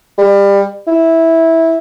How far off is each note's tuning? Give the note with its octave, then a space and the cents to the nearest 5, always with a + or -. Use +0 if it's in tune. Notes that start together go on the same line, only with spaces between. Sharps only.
G3 +25
E4 -10